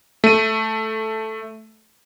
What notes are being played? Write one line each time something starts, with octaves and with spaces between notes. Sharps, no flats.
A3 D#7